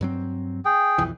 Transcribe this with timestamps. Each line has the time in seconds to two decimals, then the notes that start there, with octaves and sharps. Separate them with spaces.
0.01 G2 F#3 C4
0.65 G#4 G5
0.98 B1 F2 E3